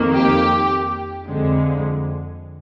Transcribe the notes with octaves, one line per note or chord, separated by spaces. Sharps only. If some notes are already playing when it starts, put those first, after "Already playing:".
Already playing: F2 D#3 A#3
G4
F2 D3 G#3